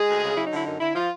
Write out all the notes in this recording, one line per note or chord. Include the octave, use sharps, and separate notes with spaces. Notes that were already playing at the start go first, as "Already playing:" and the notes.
Already playing: G#3 G#4
D2
C#3
F#3 E4
D#4
D3 E4
F#2 D#4
D3 E4
F3 F4